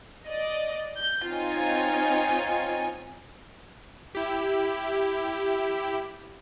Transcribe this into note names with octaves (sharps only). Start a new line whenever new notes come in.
D5 D#5
G6
C4 D#4 F4 C#5 G#5
E4 G4